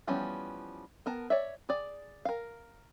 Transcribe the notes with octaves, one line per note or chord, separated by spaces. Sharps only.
E3 F3 G3 B3 C#4
B3 A#4 A5
C#5 D5 E5
G#4 D5
A#4 F5